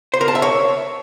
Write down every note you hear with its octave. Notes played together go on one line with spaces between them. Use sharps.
C5
A#4
A5
E5
C#5